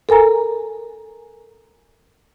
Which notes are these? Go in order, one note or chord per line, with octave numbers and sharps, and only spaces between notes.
A4 A#4 G#5 A#5